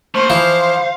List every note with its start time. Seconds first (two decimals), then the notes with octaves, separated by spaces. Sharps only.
0.14 A3 A#3 C5
0.30 E3 F3 F5